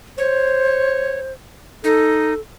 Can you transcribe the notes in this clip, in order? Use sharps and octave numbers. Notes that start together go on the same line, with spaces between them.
C5 C#5
D#4 A4